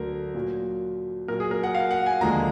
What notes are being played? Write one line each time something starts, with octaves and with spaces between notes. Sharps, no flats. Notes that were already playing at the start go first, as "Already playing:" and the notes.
Already playing: D2 D3 F#3 A#4
A#2 F#3
A#2 F#3 A#4
G#4
A#4
F#5
F5
F#5
G#5
D#2 D3 F3 G#3 A#5